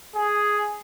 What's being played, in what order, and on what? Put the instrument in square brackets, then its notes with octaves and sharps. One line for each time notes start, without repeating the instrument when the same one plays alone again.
[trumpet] G#4